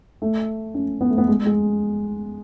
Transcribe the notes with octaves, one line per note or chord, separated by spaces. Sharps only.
A3
C#4
B3
A3
B3
G#3
G#3